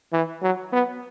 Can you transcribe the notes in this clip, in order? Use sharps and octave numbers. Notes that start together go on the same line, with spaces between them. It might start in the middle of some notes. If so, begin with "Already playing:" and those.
E3
F#3
B3